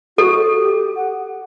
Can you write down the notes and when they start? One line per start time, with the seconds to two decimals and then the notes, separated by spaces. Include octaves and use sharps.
0.17 F#4 A4
0.57 G4
0.96 F#5